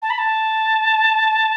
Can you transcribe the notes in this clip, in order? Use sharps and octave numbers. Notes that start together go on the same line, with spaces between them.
A5
B5
A5